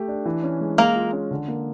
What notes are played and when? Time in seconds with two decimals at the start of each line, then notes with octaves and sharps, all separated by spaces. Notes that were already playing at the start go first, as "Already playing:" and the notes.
Already playing: A3 G4
0.08 D4
0.26 E3
0.43 C#4
0.61 G#3
0.78 G#3 A#3 A#4
0.96 F4
1.13 C#4
1.31 D3
1.48 A#3